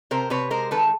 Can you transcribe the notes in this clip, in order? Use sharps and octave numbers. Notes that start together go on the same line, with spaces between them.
C3 A#4 C5
C3 B4 C#5
G#3 A#4 C5
D#3 A4 B4